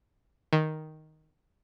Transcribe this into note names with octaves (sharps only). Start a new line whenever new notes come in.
D#3